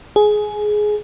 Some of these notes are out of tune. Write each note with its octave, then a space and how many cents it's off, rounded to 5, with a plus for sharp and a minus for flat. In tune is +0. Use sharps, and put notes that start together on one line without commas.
G#4 +15